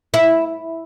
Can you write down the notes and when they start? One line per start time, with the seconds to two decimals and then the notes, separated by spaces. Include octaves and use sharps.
0.14 E4